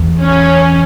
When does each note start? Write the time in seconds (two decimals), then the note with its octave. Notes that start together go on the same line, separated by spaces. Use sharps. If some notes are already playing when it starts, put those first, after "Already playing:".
Already playing: E2
0.20 C#4